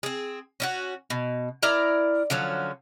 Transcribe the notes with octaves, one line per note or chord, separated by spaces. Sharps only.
C4 G#4
C#4 E4 F#4
B2
E4 A#4 D5 A#5
D3 F3 F#3 C#4